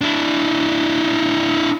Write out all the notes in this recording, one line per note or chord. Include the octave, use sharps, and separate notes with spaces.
D4 E4